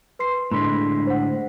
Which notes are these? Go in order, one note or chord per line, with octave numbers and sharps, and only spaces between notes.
B4 C6 C7
A2 D3 G#3 B5 C6 B6
C5 F#5